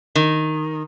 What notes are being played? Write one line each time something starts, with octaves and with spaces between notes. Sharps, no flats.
D#3